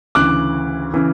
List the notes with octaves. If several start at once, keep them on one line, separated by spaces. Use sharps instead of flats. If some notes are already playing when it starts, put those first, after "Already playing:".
D2 C#3 E3 D6 F#6
C#3 E3